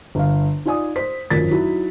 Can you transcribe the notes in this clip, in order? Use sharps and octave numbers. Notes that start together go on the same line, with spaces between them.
G1 F5
D#4 F4 D5 G#5 D#6
C5 B6
G#1 F#2 F3 A#4 A6 B6
F#3 D#4 E4 F#4